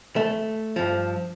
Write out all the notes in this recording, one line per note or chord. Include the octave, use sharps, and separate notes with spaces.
A3
G2 F3